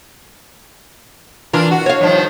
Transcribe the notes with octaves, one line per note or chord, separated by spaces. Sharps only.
E3 D4 F4 A#4
F#4
C#5 F5
G2 D#3 F3